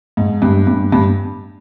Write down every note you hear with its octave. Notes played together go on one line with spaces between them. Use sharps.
G#2
G2
G2
G2